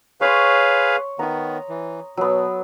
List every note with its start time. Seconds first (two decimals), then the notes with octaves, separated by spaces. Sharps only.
0.21 G#4 B4 C#5 F5 C6
1.19 D#3 B3 A#5 D#6
1.69 E3
2.17 B2 F#3 B3